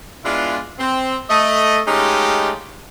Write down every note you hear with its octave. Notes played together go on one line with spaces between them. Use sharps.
G#3 B3 D4 E4 F4
C4
A3 D#5
G#3 A3 C#4 D#4 F4 G4